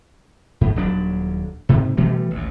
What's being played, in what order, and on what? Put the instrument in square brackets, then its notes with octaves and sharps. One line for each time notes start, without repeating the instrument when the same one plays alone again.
[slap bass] G#2
D#1 F#3 D4
G#2 C3
B2 E3 G3 A3
A1 D2